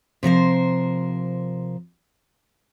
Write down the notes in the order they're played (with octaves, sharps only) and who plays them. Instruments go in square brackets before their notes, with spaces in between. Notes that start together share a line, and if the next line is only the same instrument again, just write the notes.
[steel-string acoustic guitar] C3 F3 A#4 C5